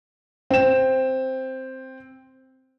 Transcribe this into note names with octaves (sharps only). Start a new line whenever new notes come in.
C4 E7